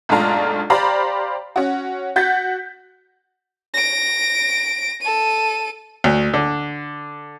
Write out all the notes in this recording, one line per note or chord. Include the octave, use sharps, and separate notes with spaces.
B1 G#2 A3 D4 F4 A#5
G4 C5 D5 F5 A#5 B5
C#4 F#4
F#4 F#5 G6 A6 B6
A#6 D7
A4 D#7
D2
D3